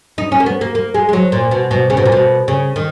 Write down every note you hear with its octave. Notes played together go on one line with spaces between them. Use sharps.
D#4
C#4
A#3
B3
A#3
A#3
G#3
G#3
F#3
A#2
B2
B2
C#3
B2
A#2
B2
C#3
D#3